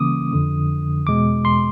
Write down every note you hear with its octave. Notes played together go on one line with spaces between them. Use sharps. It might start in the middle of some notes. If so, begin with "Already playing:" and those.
Already playing: C#3 E3 G3 A#3 C#4 D6 D#6
F2 D3 F3
E2 B2 G#3 D6
C6